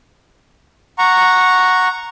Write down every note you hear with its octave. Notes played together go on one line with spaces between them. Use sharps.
F#5 A#5 C#6